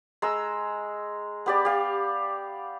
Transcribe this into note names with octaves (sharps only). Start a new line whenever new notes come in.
G#3 A#5 E6
B3 G4 D5
G4 F5